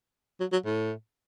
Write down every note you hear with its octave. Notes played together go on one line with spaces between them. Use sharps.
F#3
F#3
A2